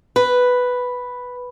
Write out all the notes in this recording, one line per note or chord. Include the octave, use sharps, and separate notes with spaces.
B4